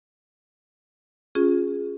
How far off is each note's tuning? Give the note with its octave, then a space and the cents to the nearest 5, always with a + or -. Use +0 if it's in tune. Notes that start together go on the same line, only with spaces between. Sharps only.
C#4 +0 F4 +25 G#4 +0